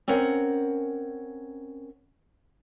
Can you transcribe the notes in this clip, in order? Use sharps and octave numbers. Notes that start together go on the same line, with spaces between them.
C4 C#4 A#4 F#5